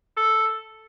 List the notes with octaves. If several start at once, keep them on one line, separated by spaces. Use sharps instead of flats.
A4